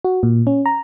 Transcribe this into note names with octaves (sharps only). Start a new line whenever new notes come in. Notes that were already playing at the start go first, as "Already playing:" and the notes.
F#4
A#2
C#4
A#5